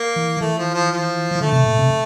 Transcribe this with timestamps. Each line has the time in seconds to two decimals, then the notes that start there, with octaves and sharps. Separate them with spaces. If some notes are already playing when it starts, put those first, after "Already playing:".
Already playing: A#3
0.16 E3
0.41 E3 A3
0.58 F3
0.74 F3
0.91 F3
1.35 E3
1.41 D3 A3
1.53 C3
1.66 A#2
1.79 C3